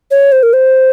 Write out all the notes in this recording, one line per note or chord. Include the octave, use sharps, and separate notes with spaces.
C#5
C5
A#4
C5